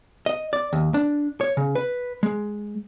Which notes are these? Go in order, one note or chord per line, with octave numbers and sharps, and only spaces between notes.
D#5
D5
D#2
D4
C#5
C#3
B4
G#3